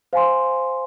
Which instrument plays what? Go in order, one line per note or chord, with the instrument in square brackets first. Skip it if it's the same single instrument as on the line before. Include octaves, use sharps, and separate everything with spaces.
[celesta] C5 F5 G#5 C6